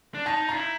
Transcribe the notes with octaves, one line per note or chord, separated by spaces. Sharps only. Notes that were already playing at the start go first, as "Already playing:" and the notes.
D4
D#4 A5
F4 A#5
E4